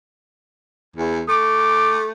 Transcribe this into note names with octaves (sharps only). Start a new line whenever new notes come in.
E2
A3 D6